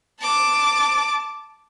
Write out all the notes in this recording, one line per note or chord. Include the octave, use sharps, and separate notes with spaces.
A5 D6